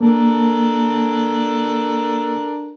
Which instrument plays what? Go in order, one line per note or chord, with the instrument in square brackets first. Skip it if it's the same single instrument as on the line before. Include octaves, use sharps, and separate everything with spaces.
[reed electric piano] A#3 [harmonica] D4 A4 A#4